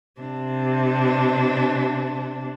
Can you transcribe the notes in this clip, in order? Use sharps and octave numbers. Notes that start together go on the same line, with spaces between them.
C3 D4